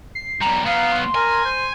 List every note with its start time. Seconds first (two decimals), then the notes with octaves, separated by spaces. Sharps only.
0.15 C7
0.41 B1 G3 A#5
0.66 F#3 B3 F5
0.92 C6
1.15 A#4 G#5
1.45 C5